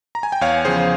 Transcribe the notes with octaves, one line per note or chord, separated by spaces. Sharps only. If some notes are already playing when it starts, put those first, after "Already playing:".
A#5
G#5
G5
E2 C#5 F5
C#3 F3 G#4 C5